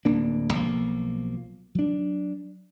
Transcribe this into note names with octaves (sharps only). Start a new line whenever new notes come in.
D1 A#3 D4
B1 F3 A#3
F#3 D4